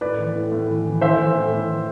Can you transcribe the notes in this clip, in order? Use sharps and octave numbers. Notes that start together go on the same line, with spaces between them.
A2 B4 D5
E3
A2
A2
E3
E3
E3 C5 E5
E3
A2
A2
E3